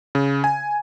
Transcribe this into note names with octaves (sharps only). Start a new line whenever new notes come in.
C#3
G#5